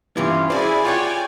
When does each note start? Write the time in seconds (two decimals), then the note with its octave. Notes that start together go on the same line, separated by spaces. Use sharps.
0.17 G2 E3 C#4 E4 F4
0.50 E4 F#4 G#4 C5 D5 G#5
0.85 F4 G4 C#5 F#5 G5